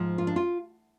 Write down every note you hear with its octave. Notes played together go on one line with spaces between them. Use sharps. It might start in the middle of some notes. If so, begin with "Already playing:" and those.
Already playing: G#2 F3
F4
D4
F4